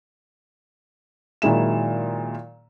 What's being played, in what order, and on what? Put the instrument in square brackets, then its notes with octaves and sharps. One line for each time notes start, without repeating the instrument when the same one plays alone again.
[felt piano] A#2 D#3 F#3 G#3 E4 E7